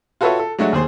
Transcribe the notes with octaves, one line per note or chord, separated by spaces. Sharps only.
F4 F#4 A4 B4 C#5 E5
A4
F#3 G#3 A3 D4 F#4
D#2 G#4 C5